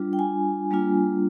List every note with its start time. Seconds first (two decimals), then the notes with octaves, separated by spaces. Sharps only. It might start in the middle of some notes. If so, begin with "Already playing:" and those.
Already playing: G3 D4 F4
0.13 G5
0.19 G#5
0.71 G3 A#3 D4 F4